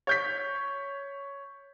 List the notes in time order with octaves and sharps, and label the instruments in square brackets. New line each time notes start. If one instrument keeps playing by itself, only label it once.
[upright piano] C#5 G6 B6